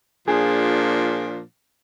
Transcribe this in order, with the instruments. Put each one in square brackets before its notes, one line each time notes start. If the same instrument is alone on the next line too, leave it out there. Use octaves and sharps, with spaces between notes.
[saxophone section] A#2 F3 D4 [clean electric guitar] G#4